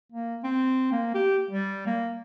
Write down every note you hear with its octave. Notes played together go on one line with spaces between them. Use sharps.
A#3
C4
A#3
G4
G3
A#3